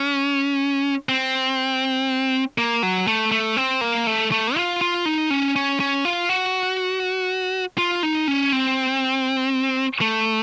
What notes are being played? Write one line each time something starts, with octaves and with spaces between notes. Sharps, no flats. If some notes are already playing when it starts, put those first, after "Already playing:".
Already playing: C#4
C4
A#3
F#3
A3
A3
C4
A#3
A3
A3
F4
F4
D#4
C#4
C#4
C#4
F4
F#4
F4
D#4
C#4
C4
A3